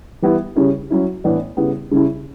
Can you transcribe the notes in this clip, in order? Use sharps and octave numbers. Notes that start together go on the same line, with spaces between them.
E3 G3 B3 E4
C#3 G3 C#4 E4
F#3 C#4 E4
A2 E3 B3 D4
C#3 G3 B3 E4
C#3 G3 C#4 E4